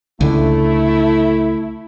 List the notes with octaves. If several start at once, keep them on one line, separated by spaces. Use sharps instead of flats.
C#2 D3 A3 E4